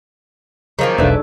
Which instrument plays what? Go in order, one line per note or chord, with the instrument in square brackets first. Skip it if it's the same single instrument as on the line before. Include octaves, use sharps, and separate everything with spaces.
[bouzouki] D#3 F3 A#3 [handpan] F#3 G#4 C#5
[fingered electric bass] E1 B1 [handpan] D4 D#4 A4 [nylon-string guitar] B4 D5 E5